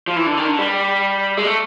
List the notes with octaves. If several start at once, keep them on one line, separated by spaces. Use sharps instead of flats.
F3
E3
D3
D#3
D3
G3
G#3
A3